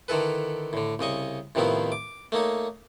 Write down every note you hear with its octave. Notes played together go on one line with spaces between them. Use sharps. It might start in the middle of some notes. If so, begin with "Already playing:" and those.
D3 D#3 E4 A4 B4
A2 D3
C2 C#3 D#5 C#6
A2 C3 D#3 F3 B3 E4
D6
A3 A#3 D#4 C#5